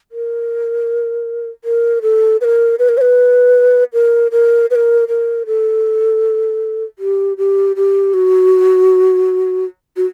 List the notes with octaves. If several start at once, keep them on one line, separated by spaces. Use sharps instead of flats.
A#4
A#4
A4
B4
A#4
B4
A#4
C#5
B4
A#4
A#4
B4
A#4
A#4
A4
G4
G4
G4
F#4
F#4